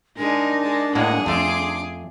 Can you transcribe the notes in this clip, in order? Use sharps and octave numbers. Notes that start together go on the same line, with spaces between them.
G#3 D4 D#4 A#4
G#3 A5
A2 G#3 A#3 G#4 F#5
F2 A3 C6 D6